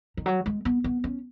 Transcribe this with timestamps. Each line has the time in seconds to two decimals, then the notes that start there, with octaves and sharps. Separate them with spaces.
0.17 D#3
0.26 F#3
0.46 G#3
0.65 B3
0.84 B3
1.04 C#4